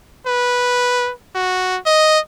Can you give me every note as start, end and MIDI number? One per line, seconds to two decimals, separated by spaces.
0.27 1.11 71
1.35 1.78 66
1.86 2.19 75